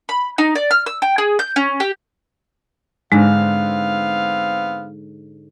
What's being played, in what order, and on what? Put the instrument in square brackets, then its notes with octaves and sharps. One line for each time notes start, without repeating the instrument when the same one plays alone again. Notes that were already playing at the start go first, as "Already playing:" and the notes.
[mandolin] B5
D#4
D5
F6
E6
G5
G#4
G6
C#4
G4
[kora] G#2 D3 [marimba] G#3 [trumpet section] B3 C4 F5